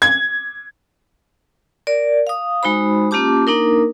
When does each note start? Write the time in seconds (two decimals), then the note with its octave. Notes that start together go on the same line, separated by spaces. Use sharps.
0.02 G#6
1.87 A#4 D5
2.27 F5 D#6
2.63 G#3 D#4 F#4 C5 B5
3.11 A#3 C#4 F4 G4 A5 D6
3.47 A#3 D4 D#4 A#4